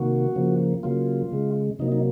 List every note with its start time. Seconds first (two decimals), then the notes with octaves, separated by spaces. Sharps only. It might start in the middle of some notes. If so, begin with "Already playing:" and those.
Already playing: C3 D#3 A#3 F#4
0.36 C#3 F3 A#3
0.83 C#3 F#3 A#3 F4
1.32 C#3 G#3
1.79 C3 F#3 A#3 D#4
1.92 D#4